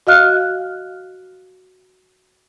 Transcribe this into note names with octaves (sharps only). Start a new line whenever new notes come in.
F#4 D#5 F5 F6 F#6